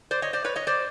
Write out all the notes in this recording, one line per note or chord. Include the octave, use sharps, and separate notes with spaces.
C5 D5
C#5 D#5
C5 D5
B4 C#5
C#5 D#5
C5 D5